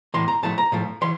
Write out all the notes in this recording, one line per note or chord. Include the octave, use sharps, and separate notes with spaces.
A2 E3 A#3 C6
A#5
A2 F3 A3 A5
A#5
A2 F3 A3
E3 C6